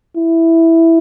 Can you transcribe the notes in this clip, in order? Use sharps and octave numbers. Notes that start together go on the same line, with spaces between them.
E4